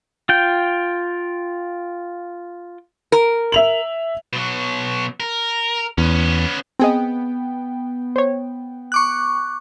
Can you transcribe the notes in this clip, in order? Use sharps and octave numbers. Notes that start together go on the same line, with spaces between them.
F4 G5
A#4
E5 F7 F#7
B2 F#3
A#4
E2 B3 C#4
B3 C4 G#4 D#5 G5
C5 C#5
C#6 D6 F#6